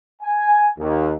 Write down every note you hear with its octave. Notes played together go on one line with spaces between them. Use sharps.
G#5
D#2